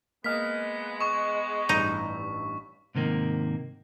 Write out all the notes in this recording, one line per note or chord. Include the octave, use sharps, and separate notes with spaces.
G#3 A#3 B3 F6 B6
C#6 D#6 E7
A1 G2 D#4
G#2 C3 D#3 A#3